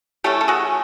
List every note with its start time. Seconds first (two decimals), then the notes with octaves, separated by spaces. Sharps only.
0.24 E3 A3 C#4 G4 A4
0.41 A4
0.48 F#4 G#4